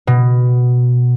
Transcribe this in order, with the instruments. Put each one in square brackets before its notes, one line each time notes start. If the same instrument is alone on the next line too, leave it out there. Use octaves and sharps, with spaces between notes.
[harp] B2